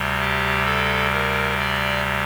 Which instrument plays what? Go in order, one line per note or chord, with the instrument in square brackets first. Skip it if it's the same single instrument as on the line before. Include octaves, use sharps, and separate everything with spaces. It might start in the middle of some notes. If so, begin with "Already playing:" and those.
Already playing: [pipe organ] D2 C3 G3
G4
A4
A#4
D5